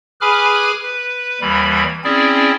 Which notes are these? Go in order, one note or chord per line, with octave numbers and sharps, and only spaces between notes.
G#4 B4 G#5 B5 D6 F6
B4
D#2 E3 G3 B5
C4 C#4 E4 G#4 D5